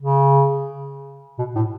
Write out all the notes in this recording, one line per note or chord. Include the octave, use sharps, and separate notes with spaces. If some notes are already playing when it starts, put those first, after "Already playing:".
C#3
B2
A2